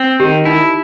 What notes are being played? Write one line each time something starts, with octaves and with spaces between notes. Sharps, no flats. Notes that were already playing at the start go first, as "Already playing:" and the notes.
Already playing: C4
D#3 G4
D#4 E4